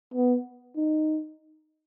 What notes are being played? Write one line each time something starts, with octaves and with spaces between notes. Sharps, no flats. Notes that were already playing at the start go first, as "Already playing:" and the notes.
B3
D#4